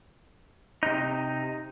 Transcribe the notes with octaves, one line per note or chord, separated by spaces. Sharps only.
C3 D#4